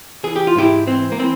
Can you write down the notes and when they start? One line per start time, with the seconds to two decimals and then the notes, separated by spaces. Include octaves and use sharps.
0.23 E3 G#4
0.36 G4
0.47 F4
0.55 G#2 E4 G4
0.87 E3 C4
1.12 A#3
1.19 E3 C4